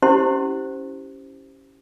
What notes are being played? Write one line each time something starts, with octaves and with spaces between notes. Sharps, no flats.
C#4 E4 G4 C5 C6